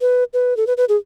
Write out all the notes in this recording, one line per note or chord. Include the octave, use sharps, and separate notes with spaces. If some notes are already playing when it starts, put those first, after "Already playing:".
B4
B4
A4
B4
B4
G#4